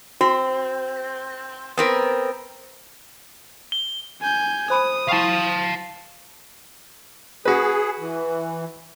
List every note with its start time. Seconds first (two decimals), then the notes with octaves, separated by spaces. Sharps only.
0.21 C4 F#4
1.78 B3 C4 A#4
3.72 G7
4.21 G#5 G6
4.70 C5 B5 D#6
5.09 E4 F5 G5 A5 C#6
7.45 F#4 G#4 B4
7.99 E3